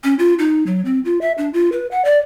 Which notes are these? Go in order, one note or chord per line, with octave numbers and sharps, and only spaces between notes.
C#4
F4
D#4
F#3
C4
F4
E5
D4
F4
B4
F#5
D5